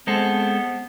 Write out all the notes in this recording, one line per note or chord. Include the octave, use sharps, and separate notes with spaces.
G#3 B3 C4 A4